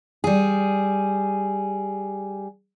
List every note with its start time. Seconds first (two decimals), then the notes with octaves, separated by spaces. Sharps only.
0.24 G3 G#4